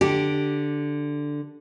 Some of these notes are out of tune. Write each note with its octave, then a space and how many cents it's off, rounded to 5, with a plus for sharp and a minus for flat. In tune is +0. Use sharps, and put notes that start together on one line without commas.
D3 +0 G4 -5